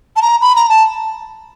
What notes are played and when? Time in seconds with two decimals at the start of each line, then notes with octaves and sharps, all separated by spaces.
0.16 A5
0.22 A#5
0.42 B5
0.56 A#5
0.69 A5